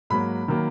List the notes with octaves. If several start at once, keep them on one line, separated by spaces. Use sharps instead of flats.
G#2 F#3 A#3 B5
D#3 F#3 A#3